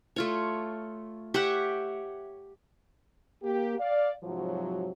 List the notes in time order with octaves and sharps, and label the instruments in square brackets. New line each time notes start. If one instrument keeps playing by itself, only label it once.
[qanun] A3 F4 C#5
G4 C#5 E5 F#5
[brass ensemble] A#3 G4
D5 F5
G#2 C3 F3 F#3